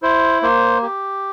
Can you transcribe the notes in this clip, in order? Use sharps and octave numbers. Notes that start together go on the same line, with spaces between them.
E4 C5
A#3 C5
G4